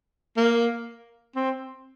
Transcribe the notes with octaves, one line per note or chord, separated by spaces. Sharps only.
A#3
C4